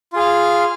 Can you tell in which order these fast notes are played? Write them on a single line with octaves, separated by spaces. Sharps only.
F4 G#4 F5